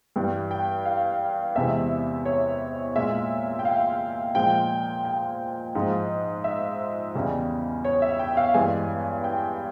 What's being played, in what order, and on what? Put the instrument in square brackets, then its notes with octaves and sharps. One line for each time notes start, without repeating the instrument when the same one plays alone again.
[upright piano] G2 E3 G3 G5
G5
F5
E2 C3 E3 G#3 E5
C#5
A#2 G#3 E5
G5
F5
A#2 F3 G#3 G5
G5
G#2 F3 G#3
E5
E2 C#3 G3
C#5
E5
G5
F5
G2 E3 G#3 G#5
G5